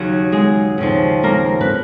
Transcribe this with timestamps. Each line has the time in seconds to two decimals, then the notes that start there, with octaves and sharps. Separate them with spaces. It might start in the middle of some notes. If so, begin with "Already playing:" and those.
Already playing: D#2 C#3 F#3
0.32 G#3 G#4
0.78 D#2 C#3 F3
1.23 A#3 A#4
1.61 B4